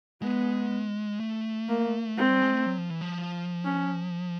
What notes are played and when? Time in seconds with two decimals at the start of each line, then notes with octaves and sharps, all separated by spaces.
0.22 G#3 B3
1.20 A3
1.68 A#3
2.17 G#3 C4
2.30 G3
2.42 G#3
2.54 A3
2.66 F#3
2.78 F3
2.90 E3
3.01 F3
3.65 C#4